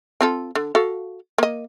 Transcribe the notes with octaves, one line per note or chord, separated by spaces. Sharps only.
C4 F4 A4
D3
F#4 A4 F5
A#3 D#5